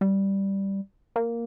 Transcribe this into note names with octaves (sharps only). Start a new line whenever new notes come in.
G3
A#3